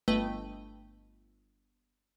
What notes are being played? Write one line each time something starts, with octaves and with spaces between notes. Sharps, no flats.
G1 A3 B4 D#5 G5